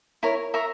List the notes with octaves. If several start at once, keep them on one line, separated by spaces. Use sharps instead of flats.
E4 A#4 C#5
A#4 E5 A#5 C#6